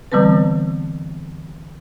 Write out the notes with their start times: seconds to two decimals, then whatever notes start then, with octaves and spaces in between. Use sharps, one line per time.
0.12 D3 E3 G3 B3 C4 B4